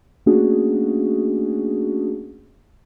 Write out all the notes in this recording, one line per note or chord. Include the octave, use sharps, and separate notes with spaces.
A3 A#3 C#4 D4 F#4 G#4